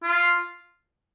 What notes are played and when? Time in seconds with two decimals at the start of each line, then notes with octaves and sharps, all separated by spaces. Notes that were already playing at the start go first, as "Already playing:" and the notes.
0.03 F4